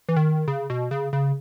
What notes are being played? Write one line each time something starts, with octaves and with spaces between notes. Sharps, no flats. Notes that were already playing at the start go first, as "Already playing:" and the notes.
E3
D#3
C#3
B2
C#3
C#3